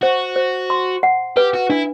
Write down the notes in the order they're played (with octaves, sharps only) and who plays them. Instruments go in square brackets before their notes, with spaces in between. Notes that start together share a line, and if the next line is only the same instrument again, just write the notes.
[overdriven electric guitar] F#4 [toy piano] C5
[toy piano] C5
C6
F#5
[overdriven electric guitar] G4 [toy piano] B4
[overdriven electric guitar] F#4
[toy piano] D4 [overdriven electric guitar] E4